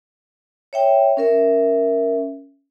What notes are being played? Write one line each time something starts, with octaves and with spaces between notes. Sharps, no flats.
C#5 E5 G5
C#4 A#4 E5